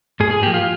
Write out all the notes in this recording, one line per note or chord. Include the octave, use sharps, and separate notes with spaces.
G#2 G#4
G#4
F3 A#3 G4
F4